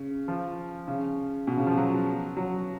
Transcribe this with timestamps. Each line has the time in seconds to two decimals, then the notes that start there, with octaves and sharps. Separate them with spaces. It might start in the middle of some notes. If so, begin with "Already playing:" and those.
Already playing: C#3
0.28 F3
0.88 C#3
1.47 B2
1.58 C#3
1.67 F3
1.77 F#3
2.37 F#3